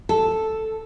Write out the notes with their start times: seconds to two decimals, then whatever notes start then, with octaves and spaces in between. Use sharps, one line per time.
0.09 A4